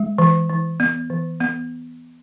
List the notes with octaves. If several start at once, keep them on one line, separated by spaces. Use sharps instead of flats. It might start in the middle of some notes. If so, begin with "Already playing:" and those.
Already playing: G#3
E3
E3
B3
E3
B3